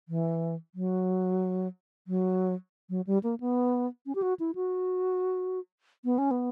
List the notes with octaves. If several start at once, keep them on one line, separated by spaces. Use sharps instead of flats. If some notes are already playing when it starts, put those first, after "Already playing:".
E3
F#3
F#3
F#3
G3
A#3
B3
C#4
G4
F#4
E4
F#4
B3
C#4
B3